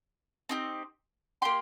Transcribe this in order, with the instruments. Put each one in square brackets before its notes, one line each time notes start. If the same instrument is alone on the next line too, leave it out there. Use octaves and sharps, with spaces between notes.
[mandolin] C4 D#4 G4
A#3 G4 G5 C6